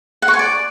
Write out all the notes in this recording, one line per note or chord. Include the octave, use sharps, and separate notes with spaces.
F#5
C#6
G#5
D5